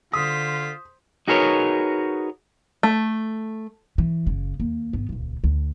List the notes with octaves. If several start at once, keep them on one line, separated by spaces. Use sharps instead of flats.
D3 F4 C5 D#6 B6
D#4 F#4 G#4 A#4 B4 C#5
A3
E3
F#1 C#3
D#2 A#3
G#1 B3
D#1 C#2
D2